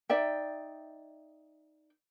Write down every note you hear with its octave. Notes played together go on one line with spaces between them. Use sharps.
D#4 D5 E5 G5